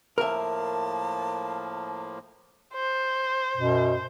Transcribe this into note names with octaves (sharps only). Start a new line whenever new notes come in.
A2 F3 A#3 A#4 E5 A5
C5
F#2 B2